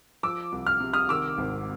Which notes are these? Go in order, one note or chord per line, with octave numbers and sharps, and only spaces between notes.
F3 D6 E6
C2
F6
C3
D#6 F6
D#3 D6 E6
G#1